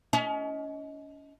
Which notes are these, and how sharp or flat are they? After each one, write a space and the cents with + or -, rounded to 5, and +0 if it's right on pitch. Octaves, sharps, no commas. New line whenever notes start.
C#4 +35 D#5 +20